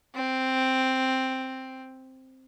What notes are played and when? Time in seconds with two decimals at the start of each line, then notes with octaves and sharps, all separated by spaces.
0.15 C4